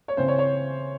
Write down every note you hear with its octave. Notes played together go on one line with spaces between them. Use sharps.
C#5
C#3 E3 C4 C5
C#5
C#5